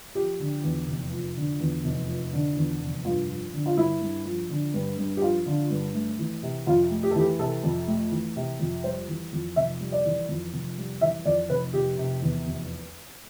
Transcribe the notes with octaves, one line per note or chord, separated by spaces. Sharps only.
F3 G4
D3
E2
F1
F3
D3
E2
F1
F3
D3
E2
F1
G2 F4
F3
D3
F4
G2 E4
G2
F3
D3
G2
G2
G4
F3 F4
D3
G2
A3
E3
C3
F2 F4
A3
G4
A4
E3 G4
C3 A4
F2
A3
E3
C3
F2
G3 C5
E3
F2
F1 E5
G3
D5
E3
F2
F1
G3
E3 E5
F2 D5
F1 B4
F1 G4
C3
E2
F1